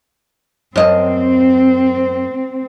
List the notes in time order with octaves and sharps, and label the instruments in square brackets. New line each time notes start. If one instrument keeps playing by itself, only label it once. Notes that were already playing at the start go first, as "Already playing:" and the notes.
[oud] F#2 D#5 [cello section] C4